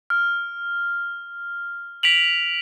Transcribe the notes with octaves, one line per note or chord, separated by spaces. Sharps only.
F6
B6 D7 F7 F#7